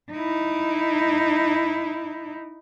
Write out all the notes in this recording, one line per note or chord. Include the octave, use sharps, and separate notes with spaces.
D#4 E4